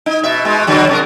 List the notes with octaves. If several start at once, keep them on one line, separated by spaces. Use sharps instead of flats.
D#4
B2 E5
B2 G#3
B2 D3 F#3
C3 G4 A#4